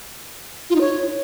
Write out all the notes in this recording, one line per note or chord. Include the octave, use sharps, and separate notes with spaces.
F4
D#4
C#5